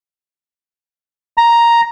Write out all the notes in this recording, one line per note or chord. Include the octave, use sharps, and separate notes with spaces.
A#5